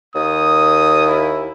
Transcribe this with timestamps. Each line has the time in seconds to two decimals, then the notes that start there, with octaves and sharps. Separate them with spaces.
0.15 D#2 D#6
1.06 E4